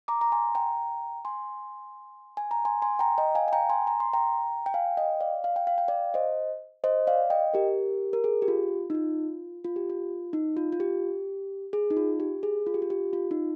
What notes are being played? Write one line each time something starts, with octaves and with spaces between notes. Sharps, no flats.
A#5 D6
A#5
G#5 C6
G5 A#5
G#5 C6
G#5
A#5
G#5 C6
G#5 C6
G5 A#5
D#5 G5
F5 G#5
G#5
G5 A#5
G#5 C6
A#5
C6
G5 A#5
G5
F5 G#5
D#5 G5
D5 F5
F5
G5
F5
G5
D5 F5
C5 D#5
C5 D#5
D5 F5
D#5 G5
G4 A#4
A#4
G#4
G4
F4
D#4
F4
F4
G4
F4
D#4
F4
F4
G4
G#4
D#4
F4
G4
G#4
F4
G4
F4
G4
F4
D#4